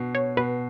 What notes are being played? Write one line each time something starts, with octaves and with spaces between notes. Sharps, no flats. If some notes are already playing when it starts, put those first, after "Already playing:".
Already playing: B2 D4
C#5
B2 B4